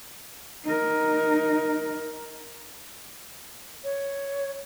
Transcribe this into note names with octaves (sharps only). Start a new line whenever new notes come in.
D#4 A#4
C#5